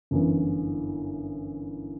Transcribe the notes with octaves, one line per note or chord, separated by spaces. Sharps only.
G1 F#2 E3